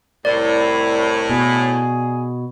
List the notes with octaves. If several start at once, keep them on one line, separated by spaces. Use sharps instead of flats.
C2 A2 D5
B2 G#4